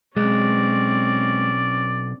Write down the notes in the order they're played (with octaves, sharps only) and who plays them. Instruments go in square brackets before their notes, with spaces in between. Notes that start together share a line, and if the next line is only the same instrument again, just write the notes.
[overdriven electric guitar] B1 [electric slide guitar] G#3 [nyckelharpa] C4 C#4 [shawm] D5